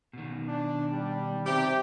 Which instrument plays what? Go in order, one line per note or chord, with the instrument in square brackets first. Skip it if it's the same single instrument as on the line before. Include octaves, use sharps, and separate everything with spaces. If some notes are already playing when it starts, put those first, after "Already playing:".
[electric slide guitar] B2 D#3
[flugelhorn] D4
G3
[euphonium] C3 [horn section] G4